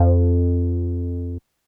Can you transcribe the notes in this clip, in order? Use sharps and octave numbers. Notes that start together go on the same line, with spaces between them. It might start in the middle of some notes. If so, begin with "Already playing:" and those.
Already playing: F2